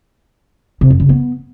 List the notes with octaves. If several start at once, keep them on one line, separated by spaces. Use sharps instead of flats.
C3
F#2
C#3
B3